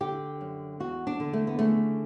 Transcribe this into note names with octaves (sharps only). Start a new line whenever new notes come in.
D3 G4
F#2
E2 F#4
D4
D3
A3
B3
C#3 A3